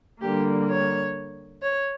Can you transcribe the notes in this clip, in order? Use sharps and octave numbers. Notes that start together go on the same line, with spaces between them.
D3 G3 A#3 G4
C#5
C#5